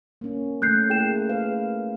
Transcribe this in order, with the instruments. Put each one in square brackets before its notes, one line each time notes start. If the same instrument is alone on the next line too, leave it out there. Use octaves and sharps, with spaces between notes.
[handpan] A#3 C#4
[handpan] A3 [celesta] F#6 G6 C7
[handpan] A#3 E4 [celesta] G#4 G5 E7
[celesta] G#4 B4 [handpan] F5